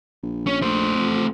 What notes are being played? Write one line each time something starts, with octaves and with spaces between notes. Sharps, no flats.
A#1
C#4
A3 C5
F2